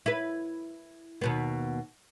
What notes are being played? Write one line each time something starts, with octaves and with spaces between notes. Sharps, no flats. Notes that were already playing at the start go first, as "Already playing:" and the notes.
E4 B4
D#2 B2 B3